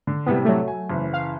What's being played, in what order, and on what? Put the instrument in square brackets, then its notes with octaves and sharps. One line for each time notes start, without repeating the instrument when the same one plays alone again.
[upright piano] D3
[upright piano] A2 C3 G3 [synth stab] B3
[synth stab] F#3 A3
[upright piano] G#5
F#1 E3
[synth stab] F5